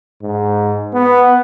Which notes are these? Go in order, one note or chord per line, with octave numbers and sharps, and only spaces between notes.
G#2
B3